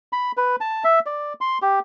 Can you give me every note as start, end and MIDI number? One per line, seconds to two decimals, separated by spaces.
0.13 0.32 83
0.37 0.56 71
0.61 0.83 81
0.84 0.99 76
1.06 1.33 74
1.41 1.58 84
1.62 1.79 67